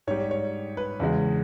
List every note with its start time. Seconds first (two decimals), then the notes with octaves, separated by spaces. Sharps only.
0.07 G#2 G3 C#5
0.31 C#5
0.77 B4
1.00 E2 C#3 G#3